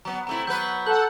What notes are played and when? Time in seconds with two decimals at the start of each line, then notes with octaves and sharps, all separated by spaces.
0.05 F#3 B3 A#5
0.27 C3 A3 E4 A#5
0.47 F#3 B3 B4 G6
0.86 A4 F#5 F#6 G6 F#7